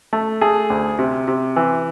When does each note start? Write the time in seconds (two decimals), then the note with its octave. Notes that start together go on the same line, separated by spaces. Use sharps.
0.13 A3
0.41 A3 G#4
0.70 D2
0.99 C3
1.28 C3
1.56 E3